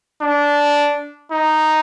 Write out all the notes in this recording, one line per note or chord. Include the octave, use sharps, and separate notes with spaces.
D4
D#4